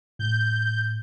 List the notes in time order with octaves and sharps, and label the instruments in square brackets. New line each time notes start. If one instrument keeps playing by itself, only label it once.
[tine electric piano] A2 [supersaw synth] G6